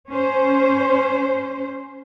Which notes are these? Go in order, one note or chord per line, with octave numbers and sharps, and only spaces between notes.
C#4 C5